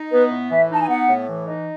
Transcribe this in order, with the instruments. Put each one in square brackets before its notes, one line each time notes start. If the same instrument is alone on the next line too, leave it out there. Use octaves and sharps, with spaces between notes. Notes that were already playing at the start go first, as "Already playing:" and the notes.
Already playing: [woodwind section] D#4
[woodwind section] B3 [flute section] B4
[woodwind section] A2
[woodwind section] E3 [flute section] E5
[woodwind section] D#4
[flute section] A5
G#5
[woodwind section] B3 [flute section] F#5
[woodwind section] A2
E3
D#4